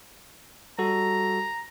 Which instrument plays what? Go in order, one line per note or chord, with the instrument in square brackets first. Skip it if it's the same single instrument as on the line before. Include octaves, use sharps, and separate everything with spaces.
[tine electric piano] G3 F#4 A4 [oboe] A#5